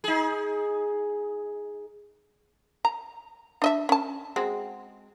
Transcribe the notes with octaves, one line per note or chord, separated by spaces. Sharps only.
D#4 G#4
A#5
D4 D#5 E5
C#4 A5
G#3 C4 F#4